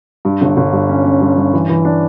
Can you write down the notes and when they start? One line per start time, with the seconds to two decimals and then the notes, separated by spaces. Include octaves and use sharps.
0.25 G2
0.41 G1
0.57 G1
0.73 G2
0.89 C#4
1.05 C#4
1.21 G2
1.37 G2
1.53 E3
1.69 E3
1.85 D4